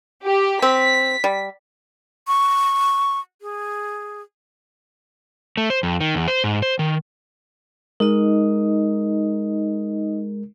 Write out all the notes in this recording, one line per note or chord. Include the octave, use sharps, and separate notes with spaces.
G4
C4 B6
G3
C#6
G#4
A3
C5
F2
D#3
E2
C5
G#2
C5
D#3
G#3 D#4 A#4 D#5